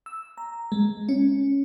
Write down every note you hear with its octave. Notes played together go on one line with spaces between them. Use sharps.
E6
A#5
G#3
C#4